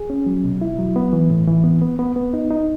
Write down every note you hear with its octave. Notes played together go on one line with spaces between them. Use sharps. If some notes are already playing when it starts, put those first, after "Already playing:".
Already playing: G#4
C#4
F#3
B2
E4
F#3
B3
E3
A2
E3
B3
B3
B3
B3
D#4
D#4